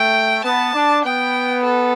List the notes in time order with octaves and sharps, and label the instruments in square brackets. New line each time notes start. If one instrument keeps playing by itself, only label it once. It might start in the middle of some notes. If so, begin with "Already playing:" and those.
Already playing: [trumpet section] A3 [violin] G5
[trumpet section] B3 [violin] A5
[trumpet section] D4
[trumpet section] B3 [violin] G5
[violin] A4